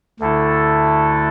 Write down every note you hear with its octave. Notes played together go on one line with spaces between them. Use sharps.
D2 D3 A3 E4 A4